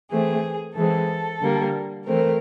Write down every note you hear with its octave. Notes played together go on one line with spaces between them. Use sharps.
E3 A3 C4 G#4
E3 G#3 C4 A4
D3 G3 A#3
E3 A3 C4 A#4